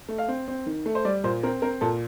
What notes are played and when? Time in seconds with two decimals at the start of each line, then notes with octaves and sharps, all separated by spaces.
0.09 A3
0.18 F5
0.28 C4
0.48 C4
0.66 D#3
0.86 A3
0.95 C5
1.05 G3 D5
1.24 A#2 C5
1.43 C4 A#4
1.62 C4 A#4
1.81 A#2 A4